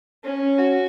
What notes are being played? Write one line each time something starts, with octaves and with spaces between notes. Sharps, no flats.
C#4
F#4